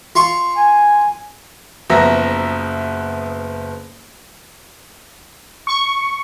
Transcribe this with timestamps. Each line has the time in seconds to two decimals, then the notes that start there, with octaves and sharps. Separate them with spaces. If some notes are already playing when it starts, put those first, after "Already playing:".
0.15 F4 C6 C#6
0.56 G#5
1.90 F#1 F3 B3 E5 A#5 A#6
5.67 C#6